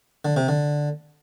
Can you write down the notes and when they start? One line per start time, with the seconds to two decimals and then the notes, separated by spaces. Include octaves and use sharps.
0.25 D3
0.37 C3
0.48 D3